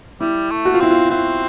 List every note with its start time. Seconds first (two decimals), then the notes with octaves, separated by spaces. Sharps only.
0.21 G3 E4
0.50 A3
0.65 F#4
0.74 F4
0.80 C4 E4
0.91 F4
1.10 C4 E4